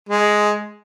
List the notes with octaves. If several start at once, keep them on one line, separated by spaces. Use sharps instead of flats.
G#3